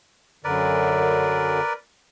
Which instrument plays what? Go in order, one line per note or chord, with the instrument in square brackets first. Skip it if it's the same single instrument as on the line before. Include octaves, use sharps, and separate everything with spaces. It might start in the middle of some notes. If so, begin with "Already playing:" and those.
[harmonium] F#2 D3 [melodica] A#4 B4 D5